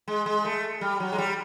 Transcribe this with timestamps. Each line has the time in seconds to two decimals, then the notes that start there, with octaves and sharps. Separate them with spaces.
0.08 G#3
0.26 G#3
0.45 A3
0.81 G3
1.00 F#3
1.12 G#3
1.18 G3